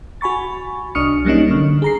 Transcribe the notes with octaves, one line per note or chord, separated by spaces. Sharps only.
F#4 G#5 B5 C#6 A6
C2 D4 C#6 D#6 F6 C#7
F#3 G3 A#3 C#4 D#4
D3
G#4 A#5 C7